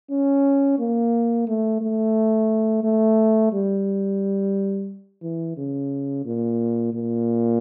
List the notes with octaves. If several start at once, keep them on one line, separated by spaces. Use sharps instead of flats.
C#4
A#3
A3
A3
A3
G3
E3
C#3
A#2
A#2